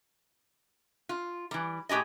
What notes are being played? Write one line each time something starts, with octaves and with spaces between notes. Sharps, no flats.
F4
E3 G3
A2 G4 G#4 D#5